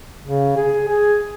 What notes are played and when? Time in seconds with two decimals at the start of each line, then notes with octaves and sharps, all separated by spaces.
0.23 C#3
0.56 G#4
0.89 G#4